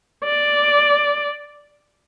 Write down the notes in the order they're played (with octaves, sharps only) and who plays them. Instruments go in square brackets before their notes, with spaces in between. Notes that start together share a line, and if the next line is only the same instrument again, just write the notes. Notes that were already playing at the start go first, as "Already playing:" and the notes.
[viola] D5